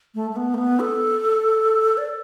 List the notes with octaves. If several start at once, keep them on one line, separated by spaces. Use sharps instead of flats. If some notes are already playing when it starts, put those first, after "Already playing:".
A3
A3
B3
A3
B3
A4
D5